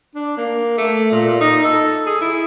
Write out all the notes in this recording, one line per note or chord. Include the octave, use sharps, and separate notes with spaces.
D4
A#3
A3
A#2
A#2
D#4
A4
G#4
E4